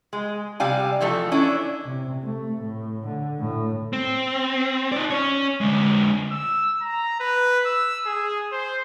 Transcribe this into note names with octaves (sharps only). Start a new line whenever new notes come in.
G#3
C3 G3 F5 G#5
E3 F3 A3 A4
C#4 D4 E4
C3
A3
A2
D3
A2
C4
D#4 D5
C#4 C#5
D3 G#3
E6
A#5
B4
E6
G#4
C5